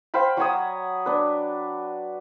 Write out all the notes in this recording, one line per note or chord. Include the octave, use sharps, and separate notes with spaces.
C5 F5 G5 B5
F#3 F#4 C#5 D#6
D4 B4